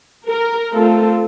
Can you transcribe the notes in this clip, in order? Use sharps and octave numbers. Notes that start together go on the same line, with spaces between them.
A#4
A3 C4 F4 A4